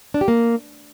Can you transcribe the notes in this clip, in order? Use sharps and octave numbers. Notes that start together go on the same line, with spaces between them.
D4
G4
A#3